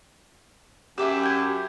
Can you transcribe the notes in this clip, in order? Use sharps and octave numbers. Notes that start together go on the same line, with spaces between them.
F#2 G4 E5 D6 E6
G6 G#6